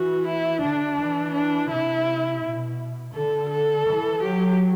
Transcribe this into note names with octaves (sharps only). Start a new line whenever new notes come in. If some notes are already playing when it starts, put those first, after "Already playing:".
Already playing: E3 F#4
E4
D3 D4
E3
D4
C3 E4
B2
D3 A4
A4
E3
F#3 G4